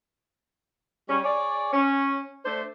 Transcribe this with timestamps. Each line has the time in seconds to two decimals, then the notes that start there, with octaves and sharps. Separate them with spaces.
1.09 G3 C#4
1.24 G#4 C#5 D5
1.73 C#4
2.46 A3 D4 C5